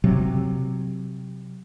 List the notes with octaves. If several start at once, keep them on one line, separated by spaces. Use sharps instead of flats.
C3 F#3